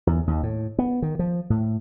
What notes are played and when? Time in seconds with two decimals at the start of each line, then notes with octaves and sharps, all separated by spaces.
0.07 E2
0.27 D#2
0.43 A2
0.79 B3
1.02 D#3
1.19 F3
1.50 A2